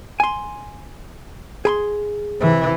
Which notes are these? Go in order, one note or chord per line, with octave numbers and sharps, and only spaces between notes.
G#5 C6
G#4 B5 C6
C3 E3